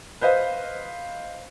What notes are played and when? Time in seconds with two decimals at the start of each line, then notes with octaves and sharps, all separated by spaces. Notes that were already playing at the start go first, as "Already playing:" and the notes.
0.21 B4 C5 D#5 F5